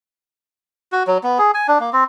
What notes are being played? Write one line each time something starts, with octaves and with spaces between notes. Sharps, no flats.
F#4
F#3
B3
G#4
G#5
D4
A#3
C4